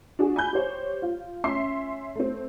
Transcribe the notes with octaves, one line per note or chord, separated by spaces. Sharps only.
D4 F#4 G#4
G#5 B5 G6
G4 C5 C#5
F4
C#4 E5 C6 C7
A3 C4